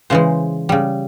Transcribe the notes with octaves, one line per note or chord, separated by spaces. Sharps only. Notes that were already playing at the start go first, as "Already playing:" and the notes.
C#3 E3 G#3 C5
C#3 G3